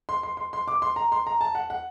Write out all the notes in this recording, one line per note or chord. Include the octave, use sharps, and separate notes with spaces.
C6
C6
C6
C6
D6
C6
A#5
C6
A#5
A5
F#5
F#5